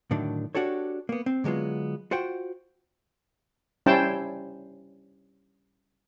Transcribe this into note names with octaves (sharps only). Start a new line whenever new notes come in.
A2 D3 D#3 F#3 D4
D4 F#4 G4 A4 C#5
A#3 B3
C4
D3 F#3 G#3 B3 F4
F4 F#4 C5 F#5 G5
G3 C#4 E4 C5 G5 A5